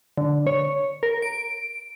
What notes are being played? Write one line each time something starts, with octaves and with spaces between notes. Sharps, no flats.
D3
C#5
A#4
D7